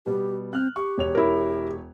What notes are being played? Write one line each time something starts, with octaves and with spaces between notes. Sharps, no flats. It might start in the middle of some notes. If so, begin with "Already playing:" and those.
B2 G3 B3 G4
C4 F6 F#6
G4 C#6
E1 C#5 F7
E4 A#4